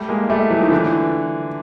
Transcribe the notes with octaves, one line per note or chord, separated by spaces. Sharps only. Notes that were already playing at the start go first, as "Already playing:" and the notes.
Already playing: G3 A3
G#3 A#3
G3 A3
E3 F#3
D#3 F3
D3 E3